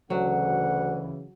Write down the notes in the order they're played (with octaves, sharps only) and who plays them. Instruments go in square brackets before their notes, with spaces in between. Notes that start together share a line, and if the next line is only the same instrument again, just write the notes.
[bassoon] D2 [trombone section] C#3 E3 [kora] F#3 F#4 [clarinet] F#5